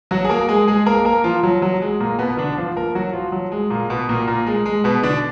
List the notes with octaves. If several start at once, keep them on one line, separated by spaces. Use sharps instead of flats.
F#3 F#4
G#4
A#3 A#4
G#3 G#4
G#3 G#4
A#3 A#4
A#3 A#4
F3 F4
F#3
F#3
G#3
A#2 A#3
B2 B3
D3 D4
F3 F4
A#3 A#4
F#3 F#4
F3 F4
F#3
G#3
A#2 A#3
B2 B3
A#2 A#3
A#2 A#3
G#3
G#3
B2 B3
D3 D4